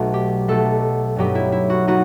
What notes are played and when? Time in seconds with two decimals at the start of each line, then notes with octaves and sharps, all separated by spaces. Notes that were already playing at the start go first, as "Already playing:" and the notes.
Already playing: B1 B2 A3
0.14 G4
0.48 B1 B2 A3 A4
1.16 G2 F#3 B3 D#4 G4
1.35 E4
1.52 E4
1.70 F#4
1.87 B3 D#4 F#4